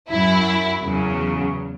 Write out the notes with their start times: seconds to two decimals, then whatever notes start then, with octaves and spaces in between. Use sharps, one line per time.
0.10 F#2 F#3 E4
0.83 E2 C#3 F#3